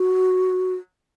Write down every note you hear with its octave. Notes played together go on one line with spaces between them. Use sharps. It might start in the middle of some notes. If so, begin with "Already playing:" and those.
Already playing: F#4